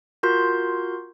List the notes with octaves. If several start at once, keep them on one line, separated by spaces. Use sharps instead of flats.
F4 F#4 A#4 C6 G6